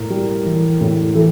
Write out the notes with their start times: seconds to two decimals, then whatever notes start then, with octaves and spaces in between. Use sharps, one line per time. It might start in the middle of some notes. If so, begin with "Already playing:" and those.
Already playing: A2 A#4
0.10 G3
0.46 E3
0.81 A2
1.15 E3 A4